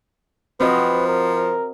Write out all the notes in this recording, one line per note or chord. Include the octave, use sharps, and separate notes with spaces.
F3 C4 F#4 B4 D#5
A#4